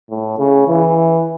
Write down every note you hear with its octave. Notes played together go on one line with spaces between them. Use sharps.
A2
C#3
E3